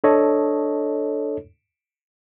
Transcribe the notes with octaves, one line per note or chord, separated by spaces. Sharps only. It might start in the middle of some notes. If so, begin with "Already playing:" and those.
D4 A4 C#5 D#5